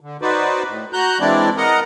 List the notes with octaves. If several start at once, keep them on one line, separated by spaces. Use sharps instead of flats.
D3
D#4 F#4 B4 C5 D5
A2
F#4 A#5 F#6 G6
E3 G#3 C4 D4 E4 D5
A#4 D#5 F#5 A#5